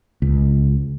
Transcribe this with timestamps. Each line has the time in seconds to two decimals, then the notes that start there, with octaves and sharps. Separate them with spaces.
0.22 C#2